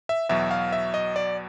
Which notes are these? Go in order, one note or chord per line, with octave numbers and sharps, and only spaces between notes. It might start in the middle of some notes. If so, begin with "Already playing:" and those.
E5
E2 B2 F#3 E5
F5
E5
D#5
D5